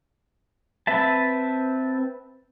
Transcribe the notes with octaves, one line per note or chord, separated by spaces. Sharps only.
C4 B4 E5 A5